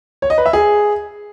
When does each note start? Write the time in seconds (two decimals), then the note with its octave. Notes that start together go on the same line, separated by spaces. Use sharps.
0.22 C#5
0.30 D#5
0.38 B4
0.46 E5
0.53 G#4